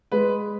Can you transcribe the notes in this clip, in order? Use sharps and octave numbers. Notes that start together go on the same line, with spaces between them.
G#3 B4